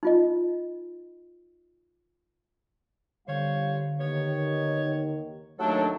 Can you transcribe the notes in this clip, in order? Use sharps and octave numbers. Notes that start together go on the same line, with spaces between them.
D#4 F4 D#5
G1 D3 G3 C5 C#5 F5
D#2 D#3 B3 C#5
D#2 F#3 A3 D4 A4